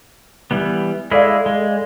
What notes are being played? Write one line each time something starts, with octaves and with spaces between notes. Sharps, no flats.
E3 G3 B3
G#3 E4 G#4 A4 D5 F5
G#3